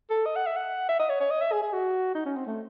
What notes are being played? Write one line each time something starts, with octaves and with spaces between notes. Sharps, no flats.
A4
D#5
F#5
E5
F#5
E5
D#5
C#5
C#5
D#5
E5
G#4
G#4
F#4
D#4
C#4
C4
A3